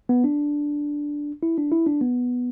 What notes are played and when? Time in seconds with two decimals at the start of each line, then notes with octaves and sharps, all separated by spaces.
0.09 B3
0.24 D4
1.43 E4
1.58 D4
1.72 E4
1.86 D4
2.01 B3